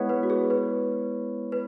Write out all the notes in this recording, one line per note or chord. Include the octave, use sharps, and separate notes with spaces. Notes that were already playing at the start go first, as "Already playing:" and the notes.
Already playing: G#3 B3 E4 C#5
B4
F#4
G#4
B4
B4